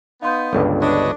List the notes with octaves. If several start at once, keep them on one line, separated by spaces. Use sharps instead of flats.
B3 D#4 F5 C6 G6
G1 C#2 G2 A4
D4 B4 C#5 D#5